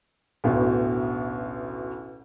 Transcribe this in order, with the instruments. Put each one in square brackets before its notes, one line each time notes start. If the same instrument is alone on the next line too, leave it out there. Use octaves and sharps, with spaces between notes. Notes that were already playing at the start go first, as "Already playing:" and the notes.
[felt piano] A1 D2 B2